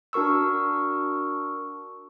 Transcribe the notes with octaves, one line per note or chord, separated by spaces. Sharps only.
D4 F#4 A#4 C#6 E6